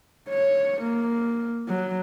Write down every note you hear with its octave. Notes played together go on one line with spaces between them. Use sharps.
C#5
A#3
F#3